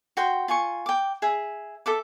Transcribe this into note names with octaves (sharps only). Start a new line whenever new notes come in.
F#4 G5 C6
F4 G#5 C#6
G5 D6
G#4 E5
A4 E5 D6